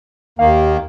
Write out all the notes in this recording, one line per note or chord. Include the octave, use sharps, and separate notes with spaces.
D#2 D#3 A#3 F5